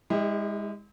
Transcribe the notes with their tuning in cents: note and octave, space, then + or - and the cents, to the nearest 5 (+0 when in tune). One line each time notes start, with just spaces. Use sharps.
G#3 -20 E4 -40 G4 +35